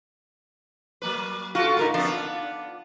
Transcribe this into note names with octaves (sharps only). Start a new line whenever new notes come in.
F#3 A#3 B4
F4 F#4 A4
A2 D#4 F4 A#4 B4
F3 B3 C4 D4
F4